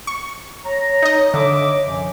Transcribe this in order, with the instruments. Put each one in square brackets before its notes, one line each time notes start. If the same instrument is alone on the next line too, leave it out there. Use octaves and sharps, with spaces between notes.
[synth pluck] C#6
[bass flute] C#5 [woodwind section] A#5
[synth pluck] D#4 D#5
[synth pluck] D3 [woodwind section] D#5 E5 D6
[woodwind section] F#2 C3 F3